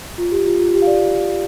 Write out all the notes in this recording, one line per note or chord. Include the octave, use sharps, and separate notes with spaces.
F4
G4
F4
F4
G4
F5
D5